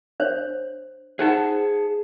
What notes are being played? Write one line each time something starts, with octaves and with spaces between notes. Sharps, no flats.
D4 C5 C#5
D#4 G#4 C5 F#5 A5